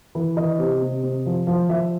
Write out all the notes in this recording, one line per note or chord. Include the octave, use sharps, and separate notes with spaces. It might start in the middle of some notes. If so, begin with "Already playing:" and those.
E3
E3 D#5
C3
C3
C3
F3
F3
F3 E5